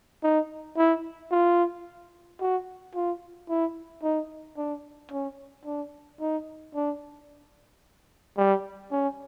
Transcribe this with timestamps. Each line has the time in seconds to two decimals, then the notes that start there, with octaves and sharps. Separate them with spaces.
0.23 D#4
0.78 E4
1.31 F4
2.40 F#4
2.95 F4
3.49 E4
4.03 D#4
4.57 D4
5.11 C#4
5.65 D4
6.20 D#4
6.75 D4
8.38 G3
8.92 C#4